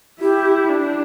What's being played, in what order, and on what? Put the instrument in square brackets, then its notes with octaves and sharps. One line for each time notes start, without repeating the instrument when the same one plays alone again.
[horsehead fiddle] E4 [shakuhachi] G4
[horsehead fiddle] D4